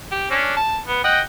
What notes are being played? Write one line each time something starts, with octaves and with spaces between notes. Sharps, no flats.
G4
C#4 D4
A5
B3
D#5 F#5 G5